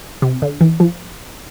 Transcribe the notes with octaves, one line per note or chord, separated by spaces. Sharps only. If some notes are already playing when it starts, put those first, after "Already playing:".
C3
D3
E3
F3